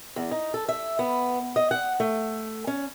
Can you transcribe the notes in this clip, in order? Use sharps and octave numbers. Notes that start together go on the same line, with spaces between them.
E2
D#4
A4
E5
B3
D#5
F#5
A3
C#4